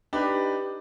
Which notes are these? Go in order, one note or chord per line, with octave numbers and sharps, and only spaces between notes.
D4 D#4 G4 B4